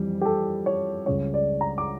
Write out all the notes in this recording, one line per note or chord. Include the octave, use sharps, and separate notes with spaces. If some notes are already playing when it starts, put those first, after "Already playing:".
Already playing: F2 E3 G3
G4
A4
C#5
C#2 C#3 G3 C#5
D5
A#5
D6